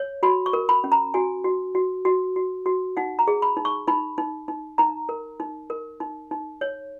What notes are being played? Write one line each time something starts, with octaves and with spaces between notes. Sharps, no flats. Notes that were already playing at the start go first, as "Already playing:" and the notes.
Already playing: C#5
F#4 B5
C#6
A#4
B5
C#4
A#5
F#4 G#5
F#4
F#4
F#4
F#4
F#4
D#4 F#5
A#5
G#4
B5
D#4
C#6
D#4 B5
D#4
D#4
D#4 A#5
A#4
D#4
A#4
D#4
D#4
C#5